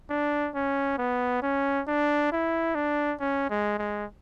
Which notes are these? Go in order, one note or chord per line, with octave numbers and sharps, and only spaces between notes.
D4
C#4
B3
C#4
D4
E4
D4
C#4
G#3
G#3